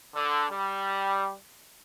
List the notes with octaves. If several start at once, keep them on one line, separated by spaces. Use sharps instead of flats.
D3
G3